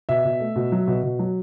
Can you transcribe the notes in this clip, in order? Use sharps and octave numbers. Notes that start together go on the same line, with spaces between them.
B2 E5
B2
A3
B2
F#3
B2
B2
F#3